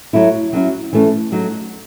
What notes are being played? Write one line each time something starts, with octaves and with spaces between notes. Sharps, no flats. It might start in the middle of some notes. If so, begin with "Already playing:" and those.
F#3 A3 E4
F#3 C#4 E4
E3 A3 C#4
F#3 A3 D#4